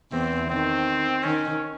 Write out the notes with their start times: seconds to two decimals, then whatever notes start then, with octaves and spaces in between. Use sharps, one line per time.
0.12 E2 E3 C4
0.50 D#3 C4
1.24 D#3 C#4